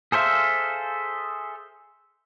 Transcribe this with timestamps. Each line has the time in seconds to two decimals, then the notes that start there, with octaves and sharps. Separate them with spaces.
0.12 G#4 A4 C5 E5 F5